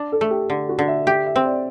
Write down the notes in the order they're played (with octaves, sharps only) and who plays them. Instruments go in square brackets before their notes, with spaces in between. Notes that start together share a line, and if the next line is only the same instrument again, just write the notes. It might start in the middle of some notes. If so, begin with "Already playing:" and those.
Already playing: [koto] D4
[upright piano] A4
[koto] A3
[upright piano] G4
[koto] D3
[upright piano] F#4
[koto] D3
[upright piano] E5
[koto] G4 [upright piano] E5
[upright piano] E5
[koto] C4
[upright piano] D5